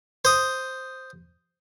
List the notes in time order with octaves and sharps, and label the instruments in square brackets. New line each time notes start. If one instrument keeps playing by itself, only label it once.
[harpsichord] C5 D#6